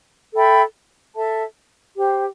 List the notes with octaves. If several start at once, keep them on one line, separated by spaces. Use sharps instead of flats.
A4 E5 G5 B5
A4 E5 A5
G4 C5 G5